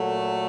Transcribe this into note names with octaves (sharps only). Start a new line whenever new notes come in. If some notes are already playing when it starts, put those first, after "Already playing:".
Already playing: A#2 F#3 A3